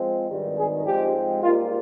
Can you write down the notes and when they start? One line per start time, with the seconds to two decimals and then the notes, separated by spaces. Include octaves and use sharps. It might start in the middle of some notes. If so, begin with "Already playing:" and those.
Already playing: F3 G#3 C4
0.27 G#1 G2 D#3 G3
0.56 G#4
0.85 G#2 F3 G#3 C4 G4
1.43 G#2 G3 A#3 F4